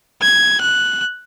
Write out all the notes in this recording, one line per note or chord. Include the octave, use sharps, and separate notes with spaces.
G#6
F#6